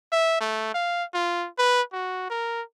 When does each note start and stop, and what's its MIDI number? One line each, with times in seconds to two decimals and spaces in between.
0.12 0.40 76
0.40 0.70 57
0.74 1.04 77
1.14 1.47 65
1.58 1.82 71
1.93 2.26 66
2.30 2.62 70